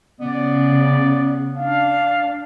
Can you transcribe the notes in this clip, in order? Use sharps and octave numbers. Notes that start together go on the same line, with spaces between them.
C#3 B3 D5
D4 F5